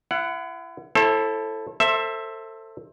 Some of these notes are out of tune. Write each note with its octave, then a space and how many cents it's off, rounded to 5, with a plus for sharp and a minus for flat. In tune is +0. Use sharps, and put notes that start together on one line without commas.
E4 +35 F#5 +0
E4 +0 A4 +0 C5 +45
A4 +25 C5 +20 E5 +0